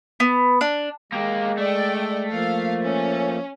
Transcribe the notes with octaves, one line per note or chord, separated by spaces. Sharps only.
B3
D4
G#3 A#3 G4
A3 D5 G5
F3 A#3 F5
C#4